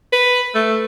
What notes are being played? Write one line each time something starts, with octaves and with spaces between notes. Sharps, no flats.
B4
A3